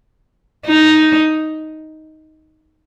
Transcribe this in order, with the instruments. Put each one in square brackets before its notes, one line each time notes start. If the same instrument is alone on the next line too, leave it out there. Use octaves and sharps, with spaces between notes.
[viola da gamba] D#4